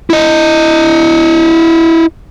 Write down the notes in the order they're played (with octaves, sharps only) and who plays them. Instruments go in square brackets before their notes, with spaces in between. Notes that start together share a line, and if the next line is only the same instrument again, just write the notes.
[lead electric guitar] E4 D#5